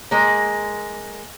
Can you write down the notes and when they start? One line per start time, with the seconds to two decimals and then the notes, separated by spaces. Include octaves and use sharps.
0.11 G#3 A#3